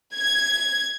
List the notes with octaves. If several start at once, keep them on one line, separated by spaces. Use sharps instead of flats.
G#6